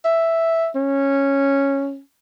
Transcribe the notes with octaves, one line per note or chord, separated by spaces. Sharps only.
E5
C#4